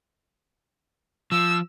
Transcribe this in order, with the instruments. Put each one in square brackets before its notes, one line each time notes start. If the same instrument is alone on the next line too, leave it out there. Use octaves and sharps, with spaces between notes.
[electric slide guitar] F3 [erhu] E6